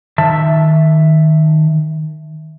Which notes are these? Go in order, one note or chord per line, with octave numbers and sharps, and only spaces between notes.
D#3 E5 A5